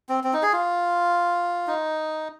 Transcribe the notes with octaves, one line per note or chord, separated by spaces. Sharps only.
C4
C4
D#4
G#4
F4
D#4